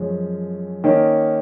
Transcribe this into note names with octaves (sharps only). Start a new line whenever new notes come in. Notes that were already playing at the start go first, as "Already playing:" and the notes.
Already playing: F#2 F3 G#3 C#4
D#3 A#3 C#4